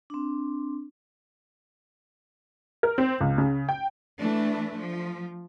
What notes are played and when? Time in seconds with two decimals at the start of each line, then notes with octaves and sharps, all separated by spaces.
0.10 C4 D4
2.83 A#4
2.98 C4
3.21 C#2
3.38 C#3
3.69 G5
4.20 E3 A3 D4
4.76 F3